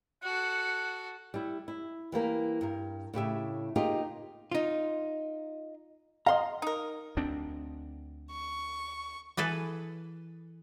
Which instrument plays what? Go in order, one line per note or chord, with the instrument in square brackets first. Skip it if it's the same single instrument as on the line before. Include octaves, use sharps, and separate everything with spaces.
[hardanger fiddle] F#4 A4 [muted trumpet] F#5
[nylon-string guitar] G3 E4
E4
E3 G3 A#3 A#4
G2 A#4
A2 C#3 G4 E5
A#3 D#4 F4 G4 G#4
[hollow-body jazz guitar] D#4 F4
[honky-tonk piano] D#5 F5 [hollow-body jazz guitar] A#5 C6
[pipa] D#4 A#4
[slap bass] D2 C4 D4
[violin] C#6
[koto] E3 G#4 A4 B4